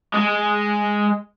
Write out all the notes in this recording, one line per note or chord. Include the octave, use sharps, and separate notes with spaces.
G#3